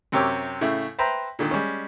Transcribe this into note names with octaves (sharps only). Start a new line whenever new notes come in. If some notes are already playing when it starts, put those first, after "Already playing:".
F#2 C3 G4 C#5 D6 E6
A2 C#3 E4
B4 C5 E5 G5 A#5
A#2 D3 D#3
G3 G#3 C#4